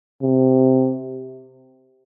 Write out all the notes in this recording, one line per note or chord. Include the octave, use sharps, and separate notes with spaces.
C3